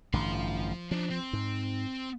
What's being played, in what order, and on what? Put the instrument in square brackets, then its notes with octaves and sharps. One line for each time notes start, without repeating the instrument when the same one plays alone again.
[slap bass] A1 G2 D3 [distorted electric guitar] F3 C6
[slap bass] F3 [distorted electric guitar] D4 D#4
[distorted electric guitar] C4
[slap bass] G#2